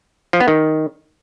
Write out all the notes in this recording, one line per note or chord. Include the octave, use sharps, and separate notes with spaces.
F3
B3
D#3